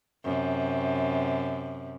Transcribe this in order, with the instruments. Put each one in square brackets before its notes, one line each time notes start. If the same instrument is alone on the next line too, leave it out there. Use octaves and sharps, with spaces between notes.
[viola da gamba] F#2 C3